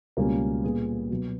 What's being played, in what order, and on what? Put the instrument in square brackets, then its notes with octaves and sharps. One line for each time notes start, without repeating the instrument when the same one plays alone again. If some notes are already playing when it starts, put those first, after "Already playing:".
[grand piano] C#2 B2 G3 A#3 C#4 A#4
A#2 G3 B3 G#4
B2 F#3 B3